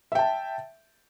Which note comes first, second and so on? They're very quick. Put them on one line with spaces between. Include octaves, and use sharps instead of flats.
E5 G5 A5